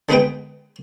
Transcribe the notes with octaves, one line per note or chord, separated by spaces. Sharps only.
D3 G#3 B3 G#4 B4 G5